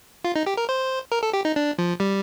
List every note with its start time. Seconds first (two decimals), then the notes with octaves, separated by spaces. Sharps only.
0.25 F4
0.36 D#4
0.46 G4
0.57 A#4
0.69 C5
1.12 A#4
1.23 A4
1.33 G4
1.45 D#4
1.56 D4
1.78 F3
2.00 G3